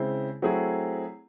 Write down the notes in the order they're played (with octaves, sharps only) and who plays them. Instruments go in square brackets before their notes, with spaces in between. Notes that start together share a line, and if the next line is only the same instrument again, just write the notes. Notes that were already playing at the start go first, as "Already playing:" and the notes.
Already playing: [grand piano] C#3 G#3 C4 E4 C5
F#3 A3 C4 E4 G#4